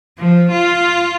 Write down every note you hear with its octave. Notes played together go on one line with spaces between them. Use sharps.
F3
F4